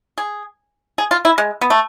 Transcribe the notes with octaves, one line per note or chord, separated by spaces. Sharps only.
G#4
G#4
F4
E4
G#3
B3
A3